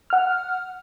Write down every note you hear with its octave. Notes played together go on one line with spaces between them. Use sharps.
F#5 F6